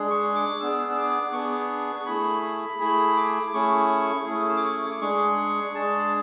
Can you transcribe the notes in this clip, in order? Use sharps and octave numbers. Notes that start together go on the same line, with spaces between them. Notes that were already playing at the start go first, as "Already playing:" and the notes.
Already playing: G#3 D4 G#4
C#6
D6
B3 D4 G#4 E6
E6
D6
B3 D4 G#4 C#6
A3 E4 G#4 B5
B5
A3 E4 G#4 B5
D6
A3 C#4 E4 G#4 C#6
A3 C#4 E4 G#4
E6
D6
C#6
D6
G#3 D4 G#4 C#6
G#3 D4 G#4 A5